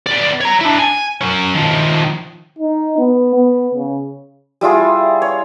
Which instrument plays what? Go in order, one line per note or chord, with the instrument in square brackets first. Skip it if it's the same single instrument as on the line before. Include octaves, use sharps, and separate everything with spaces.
[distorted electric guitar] B3 D5
C#5 A#5
D4 E4
G#5
F#3 C#4
D#3 F3
[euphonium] D#4
B3
B3
C#3
[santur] G3 E4 F4 G#4
C#5